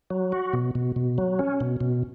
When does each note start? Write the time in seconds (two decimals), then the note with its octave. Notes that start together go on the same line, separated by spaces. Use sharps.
0.10 F#3
0.32 F#4
0.53 B2
0.75 B2
0.96 B2
1.18 F#3
1.39 C#4
1.60 B2
1.81 B2